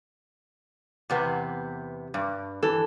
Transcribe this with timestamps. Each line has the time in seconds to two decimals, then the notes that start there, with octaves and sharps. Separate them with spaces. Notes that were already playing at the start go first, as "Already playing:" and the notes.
1.10 E2 C3 B3
2.14 G2
2.63 E3 A4